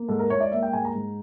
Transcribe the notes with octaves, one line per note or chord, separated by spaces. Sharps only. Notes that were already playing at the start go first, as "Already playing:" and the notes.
Already playing: A#3
G#2 A4
A#4
G#2 C#5
D5
A#3 E5
G5
G#2 G#5
A#5
G#2